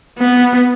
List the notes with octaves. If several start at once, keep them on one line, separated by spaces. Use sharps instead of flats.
B3